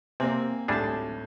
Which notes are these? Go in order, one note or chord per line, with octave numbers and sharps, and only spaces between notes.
C3 A#3 C4 C5 G#5
G#1 D2 A2 G3 D4 G#4 A5 G#6